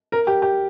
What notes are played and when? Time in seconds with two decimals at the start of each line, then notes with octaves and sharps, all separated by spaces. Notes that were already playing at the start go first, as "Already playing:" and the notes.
0.12 A#4
0.27 G4
0.42 G4